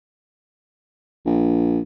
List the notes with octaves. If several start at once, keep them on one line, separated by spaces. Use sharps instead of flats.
A#1